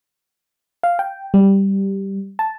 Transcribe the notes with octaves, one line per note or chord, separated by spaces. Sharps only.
F5
G5
G3
A5